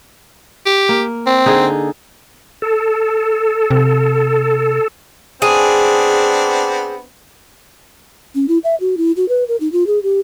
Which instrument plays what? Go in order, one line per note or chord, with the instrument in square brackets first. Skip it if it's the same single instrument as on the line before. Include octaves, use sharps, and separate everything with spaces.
[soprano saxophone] G4
[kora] A#3
[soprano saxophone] C4
[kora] D3 D#4 G#4
[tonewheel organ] A4
[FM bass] C3
[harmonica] B3 C4 D4 [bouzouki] G#4
[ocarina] C#4
E4
E5
F#4
E4
F#4
B4
A#4
D#4
F4
G#4
G4